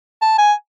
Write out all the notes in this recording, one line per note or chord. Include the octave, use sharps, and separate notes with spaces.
A5
G#5